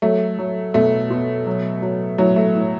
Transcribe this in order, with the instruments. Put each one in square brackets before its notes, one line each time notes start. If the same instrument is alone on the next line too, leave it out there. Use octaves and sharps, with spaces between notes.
[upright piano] F#3 A3
F#3
B2 A3
B2
F#3
F#3
A2 F#3
A3
A2